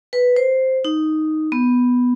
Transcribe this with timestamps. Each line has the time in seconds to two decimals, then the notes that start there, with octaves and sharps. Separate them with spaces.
0.13 B4
0.36 C5
0.85 D#4
1.52 B3